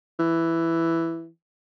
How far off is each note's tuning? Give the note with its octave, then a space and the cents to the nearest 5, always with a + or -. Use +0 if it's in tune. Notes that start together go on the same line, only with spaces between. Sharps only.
E3 +5